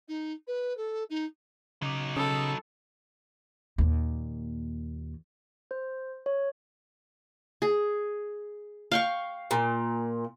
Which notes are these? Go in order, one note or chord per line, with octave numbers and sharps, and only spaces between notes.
D#4
B4
A4
D#4
C#3 F#3 D#4 D6
C#3 A4 B5 D#6
D#2 A#2
C5
C#5
G#4
F5 G5 C#6
A#2